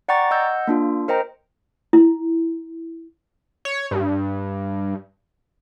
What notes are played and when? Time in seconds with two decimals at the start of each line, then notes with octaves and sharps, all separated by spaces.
0.08 D5 F#5 G5 A#5 C#6 A6
0.31 D#5 F#5 E6 G6
0.67 A#3 D4 F4
1.08 A#4 C5 D#5 G5 A#5
1.93 E4
3.65 C#5
3.91 G2